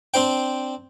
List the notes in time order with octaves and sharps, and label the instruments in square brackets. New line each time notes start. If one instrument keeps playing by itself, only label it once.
[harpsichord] C4 D4 C5 G5